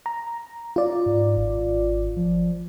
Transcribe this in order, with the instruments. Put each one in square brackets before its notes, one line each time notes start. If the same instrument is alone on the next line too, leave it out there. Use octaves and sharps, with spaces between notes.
[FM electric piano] A#5
F4 D5
[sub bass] G#2
G#1
F3